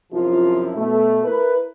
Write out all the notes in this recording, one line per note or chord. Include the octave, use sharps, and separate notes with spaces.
F#2 C3 F3 E4 F4
B2 A3
E4 A#4 B4